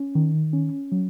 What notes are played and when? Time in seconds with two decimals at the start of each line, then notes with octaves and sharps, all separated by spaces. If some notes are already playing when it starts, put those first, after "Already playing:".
Already playing: C#4
0.15 D#3
0.53 C#4
0.92 F#3